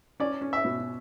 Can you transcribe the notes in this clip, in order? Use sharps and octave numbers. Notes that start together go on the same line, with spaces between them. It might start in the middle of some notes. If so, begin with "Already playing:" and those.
C#4 D5
C#4
E5
B2